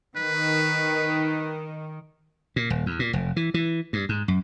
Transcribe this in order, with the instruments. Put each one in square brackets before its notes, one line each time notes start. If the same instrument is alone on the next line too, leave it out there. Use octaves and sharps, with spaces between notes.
[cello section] D#3 [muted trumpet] B4
[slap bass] A#2
D#1
E2
A#2
F1
E3
E3
G2
G#2
F#2